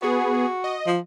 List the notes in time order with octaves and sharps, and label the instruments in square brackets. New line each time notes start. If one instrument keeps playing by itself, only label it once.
[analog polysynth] B3 G#4 [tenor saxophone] F#4
[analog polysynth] D#5
[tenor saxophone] F3